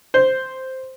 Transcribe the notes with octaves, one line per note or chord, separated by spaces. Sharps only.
C5